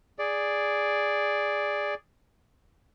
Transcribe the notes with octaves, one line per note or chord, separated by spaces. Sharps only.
G#4 D5